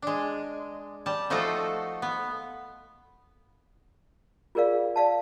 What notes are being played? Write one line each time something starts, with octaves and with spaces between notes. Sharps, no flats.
G#3 D4
G3 A5
F3 A3 D#4 F4 F#4 A4
B3
F4 G#4 A#4 D5 F5
D5 F5 A5